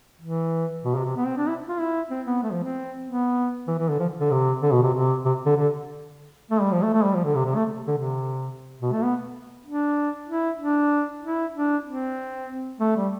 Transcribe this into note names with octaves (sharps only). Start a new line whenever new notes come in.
E3
B2
C3
C3
B3
C4
D4
E4
F4
E4
C4
B3
A3
F3
C4
B3
E3
E3
D3
F3
D3
C3
D3
B2
C3
C3
C3
D3
D3
A3
G3
F3
A3
A3
G3
F3
D3
C3
C3
A3
D3
C3
B2
A3
B3
D4
E4
D4
E4
D4
C4
A3
G3